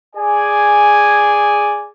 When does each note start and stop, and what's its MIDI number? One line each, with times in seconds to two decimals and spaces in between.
0.16 1.91 68
0.16 1.91 74
0.16 1.91 80